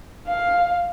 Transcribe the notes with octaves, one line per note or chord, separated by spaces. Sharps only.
F5